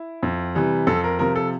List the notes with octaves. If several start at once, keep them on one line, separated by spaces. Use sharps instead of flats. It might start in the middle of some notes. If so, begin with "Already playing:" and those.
Already playing: E4
F2
C3 E3 G3
F2 A4
A#4
C3 F3 A#4
A4